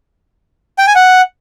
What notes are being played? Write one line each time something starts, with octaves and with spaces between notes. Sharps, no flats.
G5
G#5
F#5